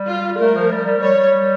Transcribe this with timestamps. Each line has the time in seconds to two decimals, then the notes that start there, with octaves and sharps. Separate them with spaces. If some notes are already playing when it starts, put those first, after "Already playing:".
Already playing: G3
0.09 F4
0.40 A3 A#4
0.55 F3
0.72 G3
0.86 G3
1.02 G3 C#5
1.17 G3